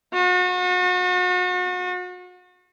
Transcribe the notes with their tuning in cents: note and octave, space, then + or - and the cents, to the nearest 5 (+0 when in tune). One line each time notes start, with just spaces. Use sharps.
F#4 -35